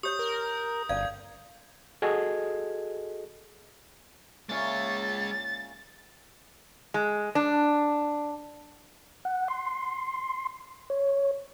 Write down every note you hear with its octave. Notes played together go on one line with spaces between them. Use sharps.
G4 C#5 D#6 G6
A#4
G1 C#4 D5 F5 G#6
F#4 G#4 A4 D#5 G#6
A#2 G#3 C#4 C#5 E5 A6
G#3
D4
F#5
C6
C#5